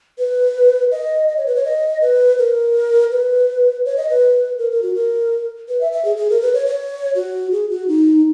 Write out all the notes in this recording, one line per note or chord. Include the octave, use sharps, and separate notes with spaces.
B4
D#5
D#5
C#5
B4
C#5
D#5
B4
A#4
B4
C#5
D#5
B4
A#4
A#4
F#4
A#4
B4
E5
E5
G#4
G#4
A#4
B4
C#5
C#5
F#4
G#4
F#4
D#4